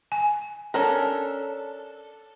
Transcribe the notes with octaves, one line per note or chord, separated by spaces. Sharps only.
G#5
C#4 D4 A4 A#4